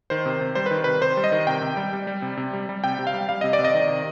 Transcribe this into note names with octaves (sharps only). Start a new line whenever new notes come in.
D#3 C5
C3
C3
G3 C5
B4
D#3
C3 B4
C3 C5
G3
D#5
D#3
C3 G5
C3
G3
G3
G3
C3
C3
G3
G3
C3 G5
C3
F5
G3
G3 F5
C3 D#5
D5
C3
D#5
D#3
C3